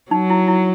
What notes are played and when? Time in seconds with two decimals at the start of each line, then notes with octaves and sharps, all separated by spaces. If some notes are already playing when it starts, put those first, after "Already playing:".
0.11 F#3 D#4
0.30 E4
0.48 E4